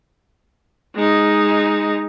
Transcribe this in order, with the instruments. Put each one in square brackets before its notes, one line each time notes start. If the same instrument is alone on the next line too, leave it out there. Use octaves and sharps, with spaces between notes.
[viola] G#3 D#4